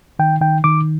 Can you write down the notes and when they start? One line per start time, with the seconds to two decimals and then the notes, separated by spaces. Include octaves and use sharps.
0.19 D#3 G5
0.41 D#3 G5
0.64 D#3 D6